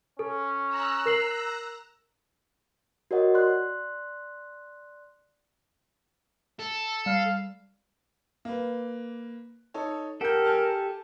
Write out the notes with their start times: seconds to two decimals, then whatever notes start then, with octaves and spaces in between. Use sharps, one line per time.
0.19 C#4 A4
0.67 A#5 E6 F#6
1.06 A#4 C7 F#7
3.11 F#4 A#4 C#5 D#5 F#5
3.34 D5 C6 F#6
6.60 A4
7.06 G3 F5
8.45 A#3 B4
9.74 D#4 A4 C#5
10.21 G4 A4 A#4 F#5 G6
10.45 G#5 A5 F6